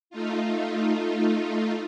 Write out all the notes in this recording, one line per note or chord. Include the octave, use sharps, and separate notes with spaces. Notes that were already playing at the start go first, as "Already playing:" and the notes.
A3 D#4 F4